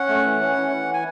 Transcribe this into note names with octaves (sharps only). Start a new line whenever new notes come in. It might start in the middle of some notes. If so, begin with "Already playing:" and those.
Already playing: C#4 F#5
A3
E3
C#4
E3
E3
G#5